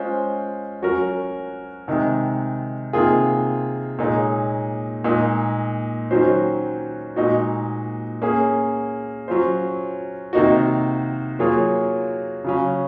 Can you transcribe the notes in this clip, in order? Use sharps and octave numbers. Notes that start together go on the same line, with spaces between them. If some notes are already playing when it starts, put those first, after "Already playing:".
Already playing: G#3 C#4 F4 C5
F#3 C#4 F#4 A#4
C3 D#3 G#3
C3 D#3 A#3 F4 G#4
A#2 G#3 D#4 G#4 C#5
A#2 G#3 D#4
D#3 F#3 C#4 F#4 C5
A#2 G#3 D#4 F#4
A#3 C#4 G#4
F#3 C#4 F4 C5
C3 D#3 A#3 D#4 F#4
F#3 A#3 F4 G#4 C#5
C#3 F#3 C#4